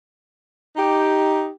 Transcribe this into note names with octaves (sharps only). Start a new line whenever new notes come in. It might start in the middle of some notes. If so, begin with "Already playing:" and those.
D#4 G4